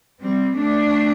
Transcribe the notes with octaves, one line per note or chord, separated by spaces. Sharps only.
G3 C4
A3 D4